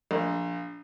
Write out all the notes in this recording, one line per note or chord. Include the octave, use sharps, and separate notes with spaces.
A#1